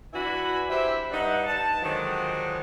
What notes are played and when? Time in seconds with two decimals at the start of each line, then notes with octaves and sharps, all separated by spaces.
0.13 E3 D4 E4 F#4 G#5 B5
0.69 E4 G4 C5 E5
1.11 G2 D#4 D5 F#5
1.47 A5
1.82 D3 D#3 F3 F#3 G#3